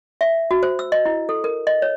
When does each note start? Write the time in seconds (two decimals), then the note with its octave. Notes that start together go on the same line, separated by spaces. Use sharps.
0.21 E5
0.51 F#4
0.63 C5
0.79 E6
0.92 D#5
1.06 E4
1.29 A4
1.44 A#4
1.67 D#5
1.82 C#5